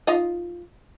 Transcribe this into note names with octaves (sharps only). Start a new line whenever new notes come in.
D#4 F4 D#5